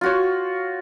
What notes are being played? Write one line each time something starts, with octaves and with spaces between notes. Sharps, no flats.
F4 F#4 C#5